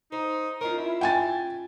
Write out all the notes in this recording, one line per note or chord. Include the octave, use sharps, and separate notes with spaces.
D#4 C5
C#4 D#4 F4 A#4
E4
G5 G#5 A6